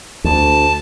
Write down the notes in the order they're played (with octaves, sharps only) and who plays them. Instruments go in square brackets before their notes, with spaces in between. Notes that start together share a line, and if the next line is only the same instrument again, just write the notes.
[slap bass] D2 [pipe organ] A5